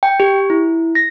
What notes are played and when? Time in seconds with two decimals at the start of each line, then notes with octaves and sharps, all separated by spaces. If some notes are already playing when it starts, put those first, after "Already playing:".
0.03 G5
0.20 G4
0.50 E4
0.95 A#6